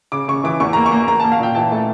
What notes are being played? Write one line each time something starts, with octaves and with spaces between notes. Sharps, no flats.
C#3 D6
C#3 C#6
E3 D6
E2 C#6
A#3 A#5
C#6
A#3
A#3 A#5
A#3 A5
F5
A#2 G5
E3 A5
A3 A5